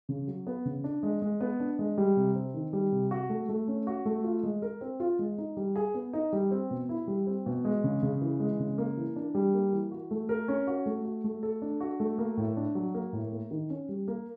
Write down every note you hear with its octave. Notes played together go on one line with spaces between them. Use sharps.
C#3
F#3
B3
C#3
D4
G#3
G#3
B3
D4
G#3
G3
C3
C4
D#3
G3
C3
F#4
A3
A3
C#4
F#4
A3
F4
G#3
A#4
C4
F4
G#3
D#4
G3
G#4
B3
D#4
G3
C4
B2
E4
G3
C4
B2
G#3
C#3
C#3
E3
G#3
C#3
A#3
E3
D4
G3
A#3
E3
F#4
A3
A#4
C#4
F#4
A3
F#4
A3
A4
D4
F#4
A3
A#3
A2
D4
F#3
A#3
A2
A#3
D#3
C#4
G3
A#3